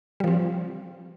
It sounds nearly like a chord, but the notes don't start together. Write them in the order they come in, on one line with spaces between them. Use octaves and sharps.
G3 F3 C4